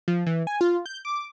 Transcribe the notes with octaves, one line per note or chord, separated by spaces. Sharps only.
F3
E3
G#5
F4
G6
D6